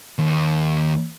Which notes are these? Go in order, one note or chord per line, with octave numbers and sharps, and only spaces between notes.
D#2